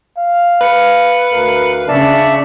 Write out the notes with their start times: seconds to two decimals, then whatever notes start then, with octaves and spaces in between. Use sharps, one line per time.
0.18 F5
0.61 B4 C#7
1.32 D2 A#4 F5
1.88 C#3 D4 D5 E5 A5